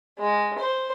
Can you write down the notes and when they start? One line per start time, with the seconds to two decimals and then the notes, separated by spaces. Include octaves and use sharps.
0.19 G#3
0.58 C5